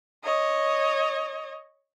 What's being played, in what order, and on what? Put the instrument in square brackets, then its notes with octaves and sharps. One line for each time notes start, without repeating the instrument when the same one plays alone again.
[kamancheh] C#5 D#5